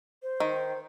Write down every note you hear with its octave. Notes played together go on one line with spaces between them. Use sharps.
C5
D#3